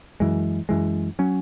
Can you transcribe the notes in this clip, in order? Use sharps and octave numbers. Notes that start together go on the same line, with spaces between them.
F#2 E3 G#3
F#2 E3 G#3
F#3 C#4